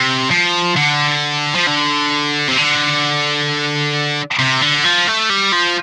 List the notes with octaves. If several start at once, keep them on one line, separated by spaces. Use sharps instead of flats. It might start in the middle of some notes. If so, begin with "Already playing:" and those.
Already playing: C3
F3
D3
F3
D3
C3
D3
C3
D3
F3
A3
G3
F3